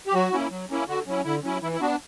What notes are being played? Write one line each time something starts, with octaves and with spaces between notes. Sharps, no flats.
G4
F#3 F#4
A#3 C#4 E4
F#3
A#3 C#4 E4
D3 F#4
F#3 C#4 E4
D3 E4
F#3 C#4 E4
E3 E4
E4
B3 D4 F#4